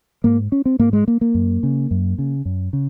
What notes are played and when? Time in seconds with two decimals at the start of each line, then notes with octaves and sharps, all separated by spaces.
0.24 G#2 A#3
0.52 C#4
0.65 C4
0.79 G#2 A#3
0.93 G#3
1.08 A#3
1.21 A#3
1.34 F#2
1.63 C#3
1.91 F#2
2.18 C#3
2.45 F#2
2.73 C#3